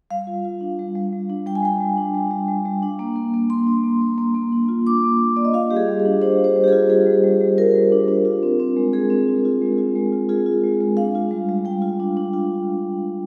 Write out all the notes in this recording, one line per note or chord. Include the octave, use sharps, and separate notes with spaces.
G3 F5
F4
F4
D4
G3
G3
G3
D4
G3 G5
G#5
G3 G5
G3
D4
G3
G3
G3
G3
D4
A#3
A#3
A#3
A#3 C6
D4
A#3
A#3
A#3
A#3
D4
F4
D4 D6
A#3
A#3
A#3 D5
D#5
F4 F5
G3 G4
G#4
G3
G#4
D4
D4 C5
D4
C5
G3
G4
F4 G#4
G3 G#4
G3
G3
G3
F4 A#4
G3
D4
D4
F4
C4
C4
G#3
G#3 G#4
C4
F4
F4
G#3
F4
G#3
F4
F4 G#4
F4
G#3
G#3
D4 F5
F4
G3
G3
G3 G5
F4
D4
D4
F4